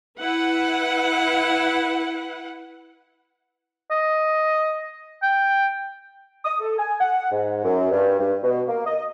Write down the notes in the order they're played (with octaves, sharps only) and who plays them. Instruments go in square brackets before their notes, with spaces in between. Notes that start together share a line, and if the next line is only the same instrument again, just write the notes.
[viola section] E4 B4 F#5
[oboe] D#5
G5
[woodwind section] D#6
A4
G#5
F#5
G#2
F#2
G2
G2
B2
A#3
D#5